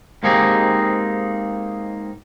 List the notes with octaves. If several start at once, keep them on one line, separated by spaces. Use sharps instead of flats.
G#2 A#3 C4 D#4 G4 G#4